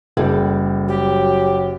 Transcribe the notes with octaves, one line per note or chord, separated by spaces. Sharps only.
F#1 G3 G#4 A4
F#3 G4